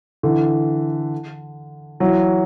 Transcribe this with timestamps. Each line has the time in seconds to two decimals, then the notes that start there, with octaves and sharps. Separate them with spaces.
0.23 D3 E3
2.00 E3 F#3